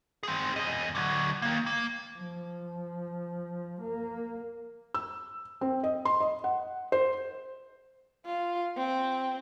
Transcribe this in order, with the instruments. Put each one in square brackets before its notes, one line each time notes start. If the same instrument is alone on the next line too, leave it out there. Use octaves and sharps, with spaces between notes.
[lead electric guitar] C4 G#4
E2 D#5
D3 F#3
D#3 A#3
A#3
[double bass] F3
A#3
[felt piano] E6
C4
D#5
C6
D#5
F#5
C5
[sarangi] F4
C4